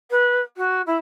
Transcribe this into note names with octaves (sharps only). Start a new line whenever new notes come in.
B4
F#4
E4